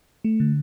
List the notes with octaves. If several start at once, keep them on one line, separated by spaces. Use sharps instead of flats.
A3
D3